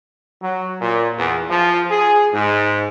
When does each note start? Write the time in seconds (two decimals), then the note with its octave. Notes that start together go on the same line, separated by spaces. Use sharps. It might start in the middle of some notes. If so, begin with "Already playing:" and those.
0.42 F#3
0.81 A#2
1.18 E2
1.50 F3
1.91 G#4
2.33 G#2